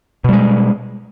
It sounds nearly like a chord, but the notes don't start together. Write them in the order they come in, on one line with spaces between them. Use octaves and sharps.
B2 G3 G#3